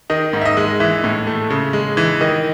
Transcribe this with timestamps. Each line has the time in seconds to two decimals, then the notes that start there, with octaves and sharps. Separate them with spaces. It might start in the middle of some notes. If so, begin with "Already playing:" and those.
0.10 D#3 D#5
0.33 G#2
0.41 E5
0.45 D#5
0.57 G#3
0.80 E3 E5
1.04 A2
1.27 A3
1.50 C#3
1.73 G#3
1.97 E3
2.21 D#3 D#5